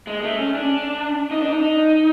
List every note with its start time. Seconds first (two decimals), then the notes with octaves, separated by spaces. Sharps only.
0.07 G#3
0.23 A3
0.39 C#4
0.55 D4
1.31 D#4
1.41 D4
1.51 D#4